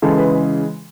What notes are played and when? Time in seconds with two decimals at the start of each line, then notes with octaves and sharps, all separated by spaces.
0.02 C#3 E3 G#3 A4
0.18 B4